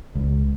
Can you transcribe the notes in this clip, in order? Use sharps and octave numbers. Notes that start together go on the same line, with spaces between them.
C#2